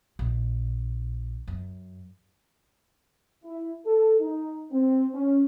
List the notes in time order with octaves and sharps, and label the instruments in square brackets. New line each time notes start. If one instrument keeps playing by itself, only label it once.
[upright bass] A#1
F#2
[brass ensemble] E4
A4
D#4
C4
C#4